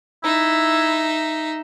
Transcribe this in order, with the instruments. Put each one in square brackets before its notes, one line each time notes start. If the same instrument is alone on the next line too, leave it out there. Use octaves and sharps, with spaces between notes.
[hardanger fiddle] D#4 E5 [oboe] E4